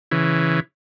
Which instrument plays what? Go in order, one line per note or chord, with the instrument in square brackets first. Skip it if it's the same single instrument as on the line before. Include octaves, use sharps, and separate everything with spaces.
[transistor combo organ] C#3 E3